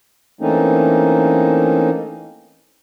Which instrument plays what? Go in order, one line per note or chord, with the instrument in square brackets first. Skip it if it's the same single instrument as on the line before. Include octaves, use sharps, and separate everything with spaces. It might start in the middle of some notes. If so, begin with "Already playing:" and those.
[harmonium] E3 A3 A#3 C4 C#4 D#4